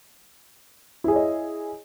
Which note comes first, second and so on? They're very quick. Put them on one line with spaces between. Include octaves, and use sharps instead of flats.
E4 G#4 C#5 D#5